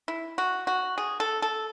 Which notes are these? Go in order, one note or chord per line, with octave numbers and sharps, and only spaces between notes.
E4
F#4
F#4
G#4
A4
A4